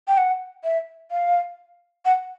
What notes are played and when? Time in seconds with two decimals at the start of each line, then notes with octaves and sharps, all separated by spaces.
0.08 G5
0.17 F#5
0.64 E5
1.11 F5
2.05 F#5